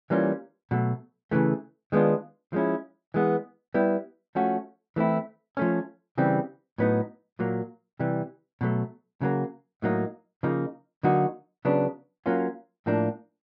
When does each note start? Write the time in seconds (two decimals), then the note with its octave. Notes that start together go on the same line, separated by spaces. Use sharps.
0.10 E3 G3 A#3 C#4 F4
0.71 B2 F#3 A3
1.31 C#3 E3 A3
1.92 D#3 G#3 B3 D4 F4
2.53 F3 G#3 C#4 E4
3.14 E3 G#3 B3
3.74 G3 B3 E4
4.35 F3 A3 C#4 F#4
4.96 E3 A3 C4 E4
5.57 F3 A3 C#4
6.18 C#3 E3 G3 C4
6.78 A2 F#3 B3 D#4
7.39 A#2 F#3 A#3
7.99 C3 E3 G3
8.61 B2 F#3 A3
9.21 C#3 F#3 A#3
9.82 A2 F#3 A#3 D#4
10.43 C#3 F3 A#3 D#4
11.03 D3 F#3 A#3 D#4 F#4
11.65 C#3 F#3 B3 D4
12.26 F#3 A#3 C#4 F4
12.86 A2 F3 A#3 D4